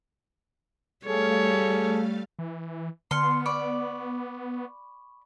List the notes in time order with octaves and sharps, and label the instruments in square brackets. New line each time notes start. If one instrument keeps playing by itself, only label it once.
[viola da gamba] G3 [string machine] A3 F5 A6 [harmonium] G#4 A4 [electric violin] C#5
[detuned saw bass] E3
[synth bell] D3 F6 C#7 [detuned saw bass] B3 [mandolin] C6
[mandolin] D5 [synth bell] B5 C#6